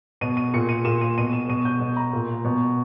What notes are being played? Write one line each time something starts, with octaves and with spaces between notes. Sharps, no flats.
B2 D#7
D#7
A#2 C#7
D#7
A#2 E7
D#7
B2 D#7
E7
B2 D#7
G6
B2
A#5
A#2
B2